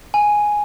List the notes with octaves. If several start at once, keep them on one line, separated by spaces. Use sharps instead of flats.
G#5